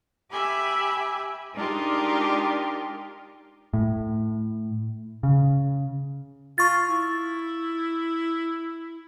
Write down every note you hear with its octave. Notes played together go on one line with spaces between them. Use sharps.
G4 E5 G#5 B5
G#3 D4 D#4 F4 G4 A#4
A2
C#3
F4 C#6 A6
E4